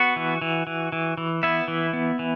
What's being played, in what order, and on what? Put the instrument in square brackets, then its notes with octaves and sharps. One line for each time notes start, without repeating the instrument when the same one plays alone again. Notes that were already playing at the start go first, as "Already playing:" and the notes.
Already playing: [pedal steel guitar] B3 F#4 F#5
E3
E3
E3
E3
E3
B3 E4 E5
E3
B3
E3